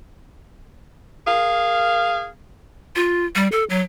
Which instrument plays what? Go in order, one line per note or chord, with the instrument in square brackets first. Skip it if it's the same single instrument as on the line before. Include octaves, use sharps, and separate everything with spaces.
[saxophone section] G#4 A#4 F5
[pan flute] F4
G3
A4
F#3